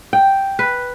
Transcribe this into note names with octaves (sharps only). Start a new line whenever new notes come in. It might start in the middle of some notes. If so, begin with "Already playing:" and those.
G5
B4